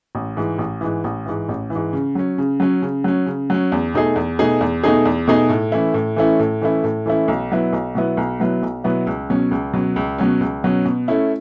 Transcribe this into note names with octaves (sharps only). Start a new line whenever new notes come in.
A1
G#2 E3
A1
G#2 E3
A1
G#2 E3
A1
E3
G#2
C#3
F#3 C#4
C#3
F#3 C#4
C#3
F#3 C#4
C#3
F#3 C#4
E2
B2 A3 D#4 G#4
E2
B2 A3 D#4 G#4
E2
B2 A3 D#4 G#4
E2
B2 A3 D#4 G#4
A2
E3 A3 C#4 E4
A2
E3 A3 C#4 E4
A2
E3 A3 C#4 E4
A2
E3 A3 C#4 E4
B1
B2 F#3 B3 E4
B1
B2 F#3 B3 E4
B1
B2 F#3 B3 E4
B1
B2 F#3 B3 E4
C#2
B2 F#3 C#4
C#2
B2 F#3 C#4
C#2
B2 F#3 C#4
C#2
B2 F#3 C#4
B2
A3 C#4 E4